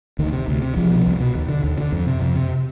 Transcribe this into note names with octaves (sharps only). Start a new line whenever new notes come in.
D2 D#3
C3
D2
C3
C2 F3
B2
C2
B2
D#2
D3
D#2
D3
F2
C3
F2
C3